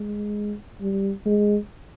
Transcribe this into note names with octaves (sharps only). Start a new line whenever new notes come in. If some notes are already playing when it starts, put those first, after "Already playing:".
Already playing: G#3
G3
G#3